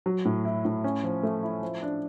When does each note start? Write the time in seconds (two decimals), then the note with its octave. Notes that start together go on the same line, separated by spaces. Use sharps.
0.06 F#3
0.25 A2
0.45 E4
0.65 A2
0.84 C#4
1.03 F3
1.23 A3
1.43 E4
1.62 F3
1.82 D4